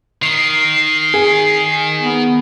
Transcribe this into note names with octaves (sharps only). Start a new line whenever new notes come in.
D#3 C7
G#4
B3